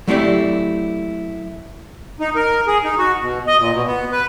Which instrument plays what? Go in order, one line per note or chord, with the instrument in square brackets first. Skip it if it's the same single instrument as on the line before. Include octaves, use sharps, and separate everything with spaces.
[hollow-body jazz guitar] F#3 A3 C4 E4 G4 D5
[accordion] D#4
A#4
G#4
D#4
F#4
B2
D#5
A#2
B2
B3
B4